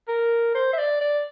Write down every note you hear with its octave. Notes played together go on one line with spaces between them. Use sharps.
A#4
C5
E5
D5
D5